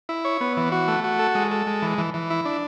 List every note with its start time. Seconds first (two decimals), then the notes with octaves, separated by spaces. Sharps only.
0.09 E4
0.25 C#5
0.41 B3
0.57 E3
0.72 F#4
0.88 A3
1.04 F#4
1.19 A4
1.35 G#3
1.51 A4
1.67 G#3
1.82 E3
1.98 E3
2.14 E3
2.30 E4
2.45 D4